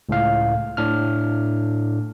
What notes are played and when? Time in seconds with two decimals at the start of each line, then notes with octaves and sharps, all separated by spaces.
0.09 C#2 A2 F5
0.77 A2 D4 F6